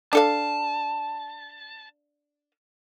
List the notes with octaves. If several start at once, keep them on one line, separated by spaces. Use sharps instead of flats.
D4 A4 F5 A5